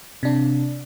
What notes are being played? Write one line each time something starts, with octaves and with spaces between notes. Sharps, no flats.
C3 D4